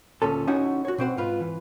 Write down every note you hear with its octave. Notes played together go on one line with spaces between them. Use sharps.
D2 A#2 C#4 A4
C#4 D#4 E4 F#4 F#5 G#5
F#4 C#5
B2 C4 C5 F#5
G#2 F4 B4
E3